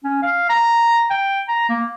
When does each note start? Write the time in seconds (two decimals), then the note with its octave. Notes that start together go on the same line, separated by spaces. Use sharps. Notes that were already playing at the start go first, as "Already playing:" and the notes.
0.04 C#4
0.22 F5
0.49 A#5
1.10 G5
1.48 A#5
1.69 A#3